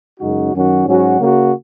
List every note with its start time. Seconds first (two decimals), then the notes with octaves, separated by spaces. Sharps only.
0.19 F#2 C#3 G#3 D#4 F#4
0.53 F#2 D#3 F#3 C#4 F#4
0.86 G#2 F#3 C#4 F#4
1.19 C#3 A#3 F#4